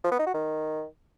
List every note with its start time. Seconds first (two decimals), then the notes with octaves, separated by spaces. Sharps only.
0.04 F3
0.11 B3
0.19 D#4
0.26 F#4
0.34 D#3